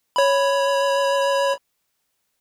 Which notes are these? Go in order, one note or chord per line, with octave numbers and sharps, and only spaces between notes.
C#5 B5